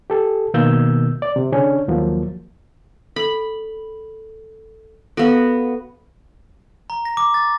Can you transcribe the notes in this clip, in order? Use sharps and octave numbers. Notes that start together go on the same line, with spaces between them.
G4 A4
B2 D#3 A#3 E6 G6
D5
C3
C#3 C#4 D4 C#5
D#2 F3 F#3 A#3
A4 B5 F#7
B3 F#4 A4 F5
A#5
A#6
D6
A6